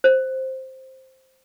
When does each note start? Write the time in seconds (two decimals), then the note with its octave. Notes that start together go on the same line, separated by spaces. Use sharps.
0.04 C5